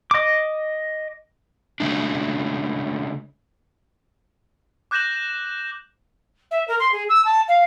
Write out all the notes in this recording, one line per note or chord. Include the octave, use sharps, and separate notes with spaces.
D#5 D6
C#3 G#3 A3 D4
D6 F#6 G6 A#6 E7 F#7
E5
A#4
C6
G#4
E6
A5
F5